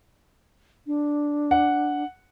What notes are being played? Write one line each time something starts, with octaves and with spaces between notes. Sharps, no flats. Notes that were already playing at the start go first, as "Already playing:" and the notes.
D4
F#5